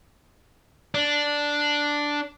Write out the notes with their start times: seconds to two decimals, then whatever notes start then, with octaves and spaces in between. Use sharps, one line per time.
0.94 D4